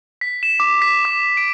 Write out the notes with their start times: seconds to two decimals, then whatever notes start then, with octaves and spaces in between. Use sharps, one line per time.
0.21 B6
0.43 E7
0.60 D6
0.82 B6
1.05 D6
1.37 D7